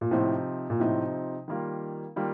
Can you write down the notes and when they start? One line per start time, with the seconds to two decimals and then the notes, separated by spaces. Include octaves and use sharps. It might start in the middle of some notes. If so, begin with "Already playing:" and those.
0.01 A#2
0.11 A2 C3 F3 C4 D#4
0.70 A#2
0.80 A2 C3 F3 C4 D#4
1.48 D#3 G3 A#3 F4
2.16 D#3 G3 A#3 F4